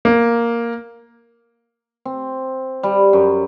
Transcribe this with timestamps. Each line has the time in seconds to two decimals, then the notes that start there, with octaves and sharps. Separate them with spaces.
0.05 A#3
2.05 C4
2.83 G3
3.13 F#2